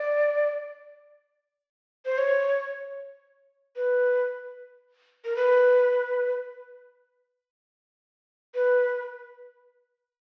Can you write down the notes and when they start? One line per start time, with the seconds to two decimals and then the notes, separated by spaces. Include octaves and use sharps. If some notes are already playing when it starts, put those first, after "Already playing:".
Already playing: D5
2.06 C5
2.18 C#5
3.76 B4
5.25 A#4
5.36 B4
8.55 B4